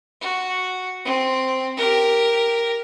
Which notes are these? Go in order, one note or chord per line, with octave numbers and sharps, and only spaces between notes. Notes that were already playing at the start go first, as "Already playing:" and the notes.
F#4
C4
G4 A#4